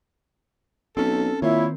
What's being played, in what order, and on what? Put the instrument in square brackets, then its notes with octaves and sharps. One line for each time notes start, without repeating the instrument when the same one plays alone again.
[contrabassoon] B1 [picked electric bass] C4 C#4 [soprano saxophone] A4
[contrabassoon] A#2 [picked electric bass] D#3 C4 [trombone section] E4 [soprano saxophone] C#5